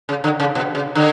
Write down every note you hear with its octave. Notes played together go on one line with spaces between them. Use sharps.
C#3
D3
C#3
B2
C#3
D3